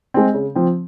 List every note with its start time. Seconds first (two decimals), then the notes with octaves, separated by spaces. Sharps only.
0.14 G#3 C4
0.34 C#3
0.55 F3 C4